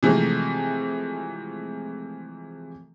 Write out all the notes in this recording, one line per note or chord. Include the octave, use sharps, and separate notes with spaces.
C3 E3 F3 G#3 A3